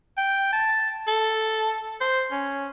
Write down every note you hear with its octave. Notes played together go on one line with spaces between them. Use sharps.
G5
A5
A4
C5
C#4